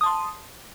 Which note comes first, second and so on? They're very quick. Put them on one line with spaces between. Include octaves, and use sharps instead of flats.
D#6 A5 C6